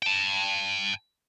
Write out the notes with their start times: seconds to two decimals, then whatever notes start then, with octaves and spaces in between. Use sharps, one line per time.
0.03 G5 A5